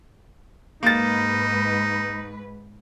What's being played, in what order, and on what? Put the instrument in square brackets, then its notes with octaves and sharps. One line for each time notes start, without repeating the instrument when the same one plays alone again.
[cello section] G#2 B4 [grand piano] A#3 A6 [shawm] D#4